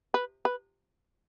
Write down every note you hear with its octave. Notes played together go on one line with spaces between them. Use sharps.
B4
B4